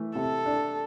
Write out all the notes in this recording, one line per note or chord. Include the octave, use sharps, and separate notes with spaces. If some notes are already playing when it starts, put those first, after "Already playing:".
Already playing: E3 A3
C3 A4
D4